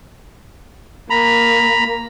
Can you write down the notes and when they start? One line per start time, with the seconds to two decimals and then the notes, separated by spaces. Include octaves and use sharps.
1.10 A#3 A#5 B5